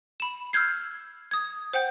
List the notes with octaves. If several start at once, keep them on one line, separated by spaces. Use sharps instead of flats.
B5 E7
E6 F6 G6 G#6 C7
D#6 G#6
C5 F#5 G5 G6